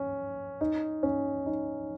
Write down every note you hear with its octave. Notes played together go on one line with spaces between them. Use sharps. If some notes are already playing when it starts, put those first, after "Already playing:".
Already playing: C#4
D#4
C#4
D#4